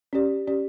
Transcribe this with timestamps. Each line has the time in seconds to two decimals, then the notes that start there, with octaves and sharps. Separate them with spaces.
0.13 C#4 G4 D5
0.47 C#4 G4 D5